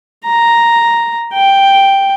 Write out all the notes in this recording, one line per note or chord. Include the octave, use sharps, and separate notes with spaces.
A#5
G5